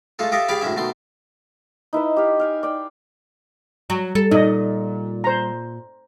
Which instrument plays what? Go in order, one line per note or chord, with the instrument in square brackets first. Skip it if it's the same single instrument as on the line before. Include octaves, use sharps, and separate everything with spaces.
[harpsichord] G#3 A3 F4 A4
F4 G4 A4 D#5 E5
C#2 G4 G#4 D5 F5 B5
D2 A2 G#3 C#4 E5
B2 D#3 A3 C6
[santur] D#4 E4 B4 E5
G4 F5
F5 G5 G#5
D5 G5
[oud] F#3
[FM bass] G3 [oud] A4
[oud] A#2 [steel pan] D#4 D#5
[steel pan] C5 A#5